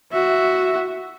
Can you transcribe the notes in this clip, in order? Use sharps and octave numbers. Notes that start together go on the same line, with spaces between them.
F#4 E5